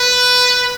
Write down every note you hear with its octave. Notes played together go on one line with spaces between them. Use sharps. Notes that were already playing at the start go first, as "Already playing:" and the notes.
Already playing: B4